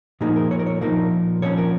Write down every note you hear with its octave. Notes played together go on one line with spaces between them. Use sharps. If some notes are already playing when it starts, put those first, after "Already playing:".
A#2 F3 A#3 D#4 G#4
A#4
C#5
A#4
C#5
A#2 F3 A#3 D#4 A#4
A#2 F3 C#4 C#5
A#4